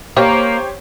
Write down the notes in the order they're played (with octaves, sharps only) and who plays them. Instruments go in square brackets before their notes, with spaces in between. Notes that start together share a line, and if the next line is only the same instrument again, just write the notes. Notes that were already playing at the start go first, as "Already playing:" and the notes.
[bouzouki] A#3 [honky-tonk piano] G4 C5 C#5